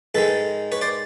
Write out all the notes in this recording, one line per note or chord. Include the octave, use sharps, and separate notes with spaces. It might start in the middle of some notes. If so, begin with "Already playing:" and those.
G#2 D#3 G#3 A4 B4
B4 C#5
C5 D5